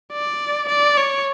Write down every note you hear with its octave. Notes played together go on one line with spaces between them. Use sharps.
D5
D5
C#5